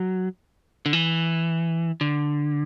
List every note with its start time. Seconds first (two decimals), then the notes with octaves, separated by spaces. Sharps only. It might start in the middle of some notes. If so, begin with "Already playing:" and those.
Already playing: F#3
0.86 D3
0.93 E3
2.01 D3